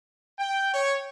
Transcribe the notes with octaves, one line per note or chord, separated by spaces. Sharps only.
G5
C#5